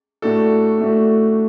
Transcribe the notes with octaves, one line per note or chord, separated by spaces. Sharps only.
A2 A3 D4 F#4 A4
A2 A3 D4 F#4 A4